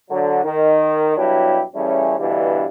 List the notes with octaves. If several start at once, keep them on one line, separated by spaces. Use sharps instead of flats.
D3 F#3
D#3
G2 B2 F#3 D4 E4 G4
C#3 E3 G3 A3 C#4
D2 G2 B2 D3 E3